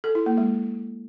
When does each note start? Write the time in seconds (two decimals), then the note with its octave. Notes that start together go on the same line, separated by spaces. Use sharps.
0.04 A4
0.15 E4
0.26 A#3
0.38 G#3